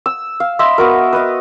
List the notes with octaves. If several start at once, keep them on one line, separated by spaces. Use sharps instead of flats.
E6
F5
D#5 E5 B5 C6
B3 F#4 A#4
B4 D#5